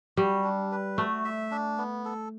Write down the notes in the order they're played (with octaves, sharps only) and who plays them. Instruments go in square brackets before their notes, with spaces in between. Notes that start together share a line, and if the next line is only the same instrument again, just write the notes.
[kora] G3 [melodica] F#4
[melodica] D4
B4
[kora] A3 [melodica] F#4
[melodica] E5
D4
B3
A4